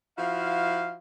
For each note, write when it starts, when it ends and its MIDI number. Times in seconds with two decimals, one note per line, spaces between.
0.17 0.97 53
0.17 0.97 64
0.17 0.97 66
0.17 0.97 77